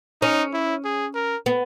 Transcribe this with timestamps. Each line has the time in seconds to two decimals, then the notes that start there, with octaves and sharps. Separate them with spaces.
0.22 C#4 D#4
0.53 E4
0.85 G#4
1.15 A#4
1.46 B3